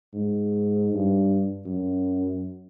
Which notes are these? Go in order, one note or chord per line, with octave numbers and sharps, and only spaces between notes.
G#2
G2
F#2